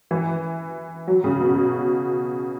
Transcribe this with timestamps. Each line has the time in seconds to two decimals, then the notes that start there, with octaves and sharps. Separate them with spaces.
0.11 E3
1.07 F#3
1.24 C#3
1.40 B2
1.56 B2